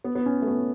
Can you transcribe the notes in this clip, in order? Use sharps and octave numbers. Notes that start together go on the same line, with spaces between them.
B3
B3
C#4
A3
B3